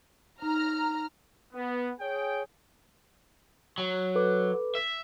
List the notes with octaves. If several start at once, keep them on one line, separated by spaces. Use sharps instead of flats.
D#4 A#5 F6
B3
G#4 C#5 G5
F#3
A4 B4 D6
E5